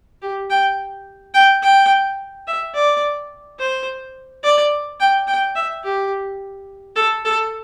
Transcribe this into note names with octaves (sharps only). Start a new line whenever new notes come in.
G4
G5
G5
G5
E5
D5
C5
D5
G5
G5
E5
G4
A4
A4